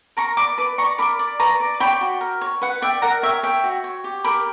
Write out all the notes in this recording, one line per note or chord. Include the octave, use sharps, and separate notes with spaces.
A#4 A#5 C#6
D5 B5 D6
B4 B5 D6
D5 A#5 C#6
A#4 B5 D6
D5
B4 A#5 C#6
D5
C#5 G5 B5
F#4
A#4
C#5
B4 F#5
D5 E5 G5
A#4 F#5 A#5
C#5 E5 G5
C#5 E5 G5
F#4
C#5
G4
A#4 B5 D6